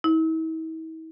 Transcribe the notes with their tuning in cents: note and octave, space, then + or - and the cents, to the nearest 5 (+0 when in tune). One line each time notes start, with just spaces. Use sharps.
E4 -45